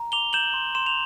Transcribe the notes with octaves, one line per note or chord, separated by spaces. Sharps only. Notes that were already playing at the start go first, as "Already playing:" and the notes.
Already playing: A#5
D6 F7 G7
G6 E7 F#7
C6
C6 E7
F7